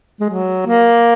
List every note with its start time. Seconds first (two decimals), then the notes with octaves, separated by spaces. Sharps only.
0.20 G#3
0.30 F#3
0.66 A#3